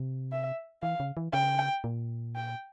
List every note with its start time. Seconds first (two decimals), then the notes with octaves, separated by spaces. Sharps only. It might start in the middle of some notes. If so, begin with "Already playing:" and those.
Already playing: C3
0.32 E5
0.83 E3 F5
1.00 C#3
1.17 E3
1.33 C#3 G5
1.84 A#2
2.36 G5